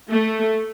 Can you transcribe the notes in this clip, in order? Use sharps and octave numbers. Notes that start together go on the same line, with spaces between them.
A3